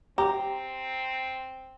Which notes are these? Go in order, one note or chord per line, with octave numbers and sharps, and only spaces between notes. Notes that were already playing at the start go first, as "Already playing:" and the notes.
C4 G4 A#5